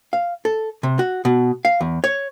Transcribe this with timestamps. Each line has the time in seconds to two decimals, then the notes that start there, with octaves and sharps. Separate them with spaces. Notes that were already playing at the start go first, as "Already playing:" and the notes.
0.13 F5
0.45 A4
0.83 C3
0.99 F#4
1.25 B2
1.65 F5
1.81 E2
2.04 C#5